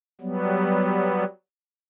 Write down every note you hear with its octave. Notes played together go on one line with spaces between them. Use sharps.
F#3 G3 B3